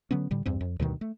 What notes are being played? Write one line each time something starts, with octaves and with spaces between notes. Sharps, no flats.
D3 F#3 B3 C#4
A2 D3 G3
E2 G2 C4
F2
D2 G2 B2 D#3
A3